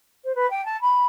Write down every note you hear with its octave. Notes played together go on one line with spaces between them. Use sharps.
C5
B4
G5
A5
B5